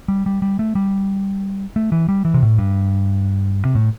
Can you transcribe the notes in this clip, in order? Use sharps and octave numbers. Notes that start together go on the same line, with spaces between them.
G3
G3
G3
A3
G3
A3
E3
G3
E3
C3
A2
G2
C3
A2